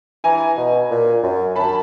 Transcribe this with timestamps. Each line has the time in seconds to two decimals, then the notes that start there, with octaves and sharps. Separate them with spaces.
0.24 E3 G#5 A#5
0.57 B2
0.90 A#2
1.23 F#2
1.56 F#2 A5 B5